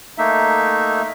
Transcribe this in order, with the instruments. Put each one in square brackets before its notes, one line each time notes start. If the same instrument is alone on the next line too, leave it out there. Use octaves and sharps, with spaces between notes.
[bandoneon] A3 A#3 D#4 E5